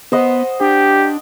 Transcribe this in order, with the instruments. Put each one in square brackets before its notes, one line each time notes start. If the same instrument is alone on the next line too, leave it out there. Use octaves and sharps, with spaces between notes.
[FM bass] B3 [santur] C5 D#5 F#5
[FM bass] D4 [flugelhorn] G4